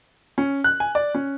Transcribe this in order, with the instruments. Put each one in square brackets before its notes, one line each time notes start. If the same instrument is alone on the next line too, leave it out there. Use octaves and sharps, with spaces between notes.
[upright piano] C#4
F#6
G#5
D5
C#4